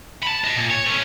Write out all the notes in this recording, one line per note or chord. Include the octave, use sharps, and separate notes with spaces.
A5 B5
D#5 A5
A#2
C#5
A3 C#4